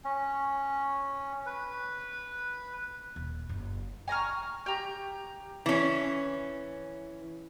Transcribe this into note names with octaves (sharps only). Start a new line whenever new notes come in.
C#4
B4
D#1
F#1
G#5 A#5 C#6 F6
G4 A#5
E3 C#4